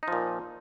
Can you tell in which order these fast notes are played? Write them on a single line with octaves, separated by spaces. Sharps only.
D#4 F3 A#2